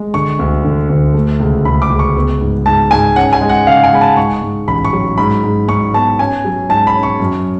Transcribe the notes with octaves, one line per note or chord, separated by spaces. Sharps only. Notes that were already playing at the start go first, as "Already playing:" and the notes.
Already playing: G#3
D3 C#6
D2
D3
D2
A3
C#2
C#2 B5
D6
C#2
C#6
B3
G#2
G#2 A5
G#2 G#5
C#4 F#5
G#5
G#3
F#5
C#3 F5
G#5
G#3 B5
A5
G#2 C#6
G#2
A1 B5
C#6
F#3
G#2 B5
G#2
G#2 C#6
B3 A5
C#4 G#5
F#3
G#2 A5
B5
C#4
C#6
F#2